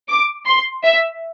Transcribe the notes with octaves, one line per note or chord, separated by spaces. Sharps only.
D6
C6
E5